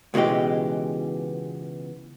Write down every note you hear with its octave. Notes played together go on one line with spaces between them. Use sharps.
C#2 B2 E3 G#3 G4